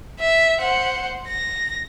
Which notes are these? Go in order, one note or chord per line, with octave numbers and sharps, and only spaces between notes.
E5
C5 F#5
A#6